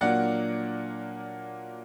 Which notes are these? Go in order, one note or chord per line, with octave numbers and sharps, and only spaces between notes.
A#2 F#3 A#3 D4 D5 F#5